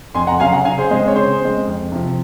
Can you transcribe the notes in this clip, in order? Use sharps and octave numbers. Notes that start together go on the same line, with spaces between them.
F2 G#5 C6
F#5 A#5
C#3 F#3 F5 G#5
F#5 A#5
C#3 F5 G#5
G#4 C5
G#3 C4 G#4 C5
C#5
C#3 G#4 C5
G#3 C4
F2
C3 F3